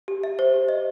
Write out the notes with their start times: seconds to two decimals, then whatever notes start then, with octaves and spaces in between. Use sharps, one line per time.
0.08 G4
0.23 E5
0.39 C5
0.54 G4
0.69 D#5